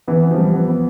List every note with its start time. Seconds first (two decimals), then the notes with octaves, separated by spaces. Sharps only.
0.08 E3 B3
0.23 B3
0.31 F3
0.38 G3
0.53 B3
0.68 B3